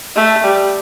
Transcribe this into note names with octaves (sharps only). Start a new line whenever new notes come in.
A3
G3